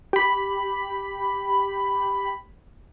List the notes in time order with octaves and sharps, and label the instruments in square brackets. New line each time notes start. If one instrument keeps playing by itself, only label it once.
[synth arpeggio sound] G4 B5